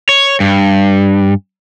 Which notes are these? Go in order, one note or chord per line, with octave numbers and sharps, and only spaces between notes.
C#5
G2